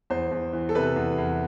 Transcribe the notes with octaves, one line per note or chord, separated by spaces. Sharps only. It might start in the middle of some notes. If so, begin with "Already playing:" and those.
E2 C5
E2
E3
A4
C3 B4
E2
E2